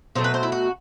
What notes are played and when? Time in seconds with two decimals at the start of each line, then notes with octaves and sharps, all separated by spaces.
0.15 B2 F#3 A3 C5
0.24 B4
0.34 C5
0.43 E4
0.52 F#4